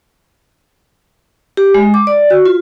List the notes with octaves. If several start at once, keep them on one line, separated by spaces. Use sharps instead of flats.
G4
G#3
D6
D5
F#4
F4